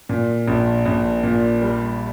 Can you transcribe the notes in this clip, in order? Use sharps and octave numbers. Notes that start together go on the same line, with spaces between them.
A#2
A#1
A#1
A#2
G3